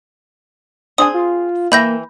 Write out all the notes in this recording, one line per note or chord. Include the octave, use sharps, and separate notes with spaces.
C4 D4 G#4 G#5 D#6
F4
E3 A#3 E5 G5 B5 G6 A#6